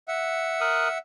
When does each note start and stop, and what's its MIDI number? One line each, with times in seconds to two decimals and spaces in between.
0.08 0.98 76
0.08 0.98 78
0.61 0.88 70
0.61 0.88 87
0.61 0.88 90